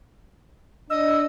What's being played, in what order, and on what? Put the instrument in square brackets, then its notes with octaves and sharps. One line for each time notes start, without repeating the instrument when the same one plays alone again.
[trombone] D4 [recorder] D#5 [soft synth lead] E6